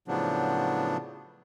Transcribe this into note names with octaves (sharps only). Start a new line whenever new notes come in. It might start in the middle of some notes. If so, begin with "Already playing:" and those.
A2 C#3 F3 F#3 B3 D4